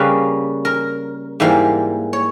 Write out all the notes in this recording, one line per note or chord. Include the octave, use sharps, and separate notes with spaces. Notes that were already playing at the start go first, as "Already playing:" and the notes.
Already playing: C#3 G3 A#3 B4
A#4
G#2 E3 G3 A#3
C#5